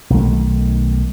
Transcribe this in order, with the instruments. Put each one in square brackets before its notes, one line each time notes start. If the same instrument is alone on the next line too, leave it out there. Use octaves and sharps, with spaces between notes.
[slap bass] B1 D#3 A3